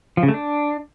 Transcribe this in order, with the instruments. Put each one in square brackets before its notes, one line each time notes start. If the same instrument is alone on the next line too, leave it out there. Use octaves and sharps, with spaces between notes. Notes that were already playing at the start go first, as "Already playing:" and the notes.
[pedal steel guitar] F3
C#3
A3
D4